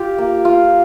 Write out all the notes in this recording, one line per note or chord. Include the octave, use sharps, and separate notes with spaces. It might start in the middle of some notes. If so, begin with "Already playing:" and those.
Already playing: F4 G4
A#3
F4